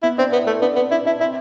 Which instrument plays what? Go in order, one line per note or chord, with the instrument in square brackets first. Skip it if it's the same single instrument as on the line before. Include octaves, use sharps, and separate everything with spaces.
[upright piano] B3 [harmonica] E4
[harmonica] C4 [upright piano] D4
[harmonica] B3 [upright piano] E4
[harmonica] A3
[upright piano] E4
[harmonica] B3 [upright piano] D4
[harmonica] B3 [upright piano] C4
[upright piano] D4 [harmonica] E4
[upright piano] D4 [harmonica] E4
[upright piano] C4 [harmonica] E4